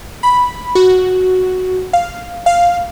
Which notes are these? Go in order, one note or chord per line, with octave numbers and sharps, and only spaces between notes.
B5
F#4
F5
F5